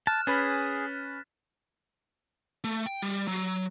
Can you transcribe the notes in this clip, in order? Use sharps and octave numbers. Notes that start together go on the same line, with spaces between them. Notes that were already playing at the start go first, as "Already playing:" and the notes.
A5 F6 F#6 E7
C#4 G#4 B4 B5 A6 B6
A3
G5
G3
F#3